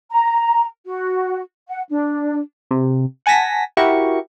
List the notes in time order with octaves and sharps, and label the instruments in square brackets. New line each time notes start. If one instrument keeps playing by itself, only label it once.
[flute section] A#5
F#4
F#5
D4
[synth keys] C3
F#5 G#5 A5 A#6 B6
E4 F#4 G4 A#4 C#6